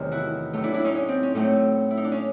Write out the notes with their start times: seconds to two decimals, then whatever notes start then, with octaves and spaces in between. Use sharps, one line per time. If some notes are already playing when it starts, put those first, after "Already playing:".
Already playing: E2 C3 D#3 F#3 A3
0.12 E4 F#4
0.53 A2 F#3 A3
0.63 D4 E4
0.74 D4 E4
0.84 C#4 D#4
0.95 C#4
1.08 C4
1.23 C#4
1.35 A2 F#3 A3 C4
1.91 E4
1.97 D#4
2.04 D4
2.12 C#4